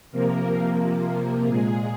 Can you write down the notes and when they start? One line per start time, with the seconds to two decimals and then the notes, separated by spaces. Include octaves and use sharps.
0.12 C3 F3 A#3 A#4
0.78 A#4
1.46 A#2 G#3 G#4